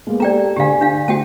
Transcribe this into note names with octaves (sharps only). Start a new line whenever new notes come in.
G#3 A#3 B3
G4 A4 D5 G5 A#5
D2 D3 G4 F5 G#5
D4 F5
A3 F#4 G5 A5